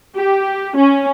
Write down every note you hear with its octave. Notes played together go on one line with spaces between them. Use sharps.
G4
C#4